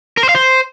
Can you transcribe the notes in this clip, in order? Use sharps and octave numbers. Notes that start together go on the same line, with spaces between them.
A#4
C5
F5
C5